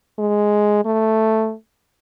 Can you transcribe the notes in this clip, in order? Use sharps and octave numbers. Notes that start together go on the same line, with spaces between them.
G#3
A3